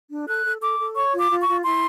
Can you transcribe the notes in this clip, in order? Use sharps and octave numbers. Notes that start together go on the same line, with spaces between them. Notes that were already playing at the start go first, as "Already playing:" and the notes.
D4
A4 F#6
A4
A4 D6
A4
C#5 C#6
F4
D6
F4
C#6
F4
E4 C6